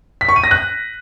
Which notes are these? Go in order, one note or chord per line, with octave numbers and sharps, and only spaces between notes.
B6
C#6
D#7
A#6
F#6